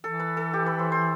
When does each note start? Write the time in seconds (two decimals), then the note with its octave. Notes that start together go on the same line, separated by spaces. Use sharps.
0.03 E3 A4
0.20 B4
0.37 A4
0.53 G4
0.66 B4
0.79 C5
0.92 C5